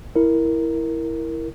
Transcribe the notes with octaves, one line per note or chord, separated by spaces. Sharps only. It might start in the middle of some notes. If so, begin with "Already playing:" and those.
E4 A#4